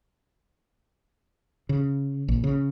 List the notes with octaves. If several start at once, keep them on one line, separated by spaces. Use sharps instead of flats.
C#3
A#1
C#3